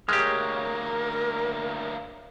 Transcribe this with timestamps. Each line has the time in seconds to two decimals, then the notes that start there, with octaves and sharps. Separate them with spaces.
0.09 D2 G#3 A#3 G4 A#4 C#5 F6